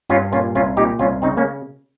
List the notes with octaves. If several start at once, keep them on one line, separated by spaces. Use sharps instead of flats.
G2 C#4 F4
A#2 C#4 F4
C2 C#4 F4
A#2 D#4 G4
C2 C#4 F4
C#3 C4 D#4
A#3 C#4